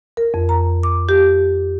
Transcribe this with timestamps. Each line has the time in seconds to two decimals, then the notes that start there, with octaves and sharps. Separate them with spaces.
0.17 A#4
0.34 F2
0.49 A#5
0.83 D6
1.09 G4